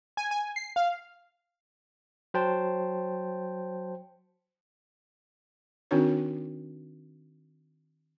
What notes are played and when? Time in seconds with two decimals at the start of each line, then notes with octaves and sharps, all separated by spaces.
0.17 G#5
0.31 G#5
0.56 C7
0.76 F5
2.34 F#3 C5 G5 A5
5.91 D#3 C4 D4 D#4 F#4 C#5